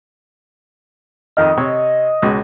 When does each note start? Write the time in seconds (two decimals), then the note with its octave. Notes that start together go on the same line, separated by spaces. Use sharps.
1.37 F2 D#3 D#5 F6
1.57 C3 C#5
2.22 C#2 B2 G#3